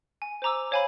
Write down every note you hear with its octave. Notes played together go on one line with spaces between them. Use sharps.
G#5
C5 G#5 A#5 D6 E6
C5 C#5 F5 G#5 A#5 B5